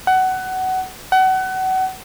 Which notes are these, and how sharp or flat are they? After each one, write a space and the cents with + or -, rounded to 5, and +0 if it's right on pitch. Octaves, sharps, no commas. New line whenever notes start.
F#5 +20
F#5 +30